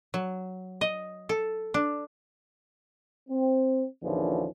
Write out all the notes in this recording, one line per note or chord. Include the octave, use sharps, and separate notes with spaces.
F#3
D#5
A4
D4
C4
A#1 D#2 D3 E3 F3 C#4